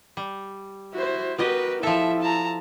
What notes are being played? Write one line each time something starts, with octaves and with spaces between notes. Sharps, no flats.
G3
E4 F#4 C5
B3 F#4 G4 A#4 B4 D#5
F3 E4 A4 E5
A5 A#5